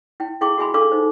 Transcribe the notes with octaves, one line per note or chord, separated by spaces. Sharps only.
E4 G5
E4 G#4 F5 G5 C#6 D6
F#4 G#4 E5 G#5 B5 C6
D4 A4 F5 C#6 D6 E6
D#4 C5